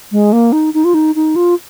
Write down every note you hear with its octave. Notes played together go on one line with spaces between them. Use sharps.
G#3
A#3
D#4
D#4
F4
D#4
D#4
F4